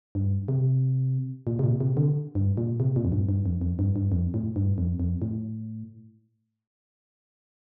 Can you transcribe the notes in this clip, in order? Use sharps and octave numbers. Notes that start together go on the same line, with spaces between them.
G2
C3
A#2
C3
A#2
C3
D3
G2
A#2
C3
A#2
F2
G2
G2
F2
F2
G2
G2
F2
A2
G2
F2
F2
A2